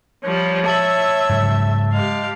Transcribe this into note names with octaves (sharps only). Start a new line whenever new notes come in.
F3 G3 C#5
E5 A5 A6 F#7
G#2 C#3 F#3
G#3 G4 F5